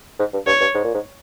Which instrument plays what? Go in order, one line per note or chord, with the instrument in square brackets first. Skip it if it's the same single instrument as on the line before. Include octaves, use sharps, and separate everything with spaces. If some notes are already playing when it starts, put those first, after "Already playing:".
[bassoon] G#2
G2
[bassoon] G2 [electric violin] C#5
[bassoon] G2
G#2
A#2
G#2